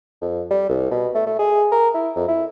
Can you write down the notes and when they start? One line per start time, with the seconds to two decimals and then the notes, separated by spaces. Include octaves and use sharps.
0.22 F2
0.51 G3
0.70 C2
0.91 B2
1.15 A3
1.27 A3
1.39 G#4
1.72 A#4
1.95 E4
2.16 F2
2.29 E4